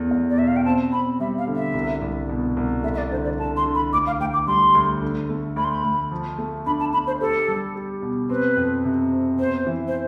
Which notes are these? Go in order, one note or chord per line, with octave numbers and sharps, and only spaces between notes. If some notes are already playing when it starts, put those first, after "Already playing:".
Already playing: E2 A3
E2
D5
B2 E5
F5
G5
C4 A5
C4 B5
G3 E5
F5
D3
E5
C2
C2
B2
C2
A3 E5
E5
D5
D3 C5
D5
D3 A5
C6
D3
B5
D2 D6
F5
D2 G5
D6
G3 C6
D2
D3
A3
D2 B5
C6
B5
D2
F3
A3
D4 B5
A5
D4 B5
C5
G4 A4
G3
G4
B2
C4 B4
F2
C3
C4
B3 C5
E3
C5